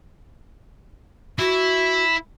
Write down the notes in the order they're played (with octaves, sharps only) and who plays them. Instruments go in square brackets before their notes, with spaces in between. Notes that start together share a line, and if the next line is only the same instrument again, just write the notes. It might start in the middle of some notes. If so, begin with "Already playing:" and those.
[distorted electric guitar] E4 [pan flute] F#4